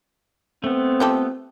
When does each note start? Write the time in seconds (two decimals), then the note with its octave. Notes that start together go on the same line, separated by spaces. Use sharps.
0.64 A3 B3 C4
1.00 F4 G4 A4